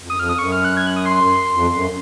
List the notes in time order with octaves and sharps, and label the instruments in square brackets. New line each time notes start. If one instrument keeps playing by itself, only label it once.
[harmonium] F2
[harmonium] F#2 [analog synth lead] D#6
[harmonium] F2 [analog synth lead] F6
[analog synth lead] D#6
[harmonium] F#2 [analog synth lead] C#6
[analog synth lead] F6
F#6
G#6
F#6
D#6
C6
C6
[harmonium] F2
F#2